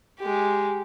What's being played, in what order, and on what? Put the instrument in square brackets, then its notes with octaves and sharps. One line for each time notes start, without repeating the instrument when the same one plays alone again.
[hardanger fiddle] G#3 G4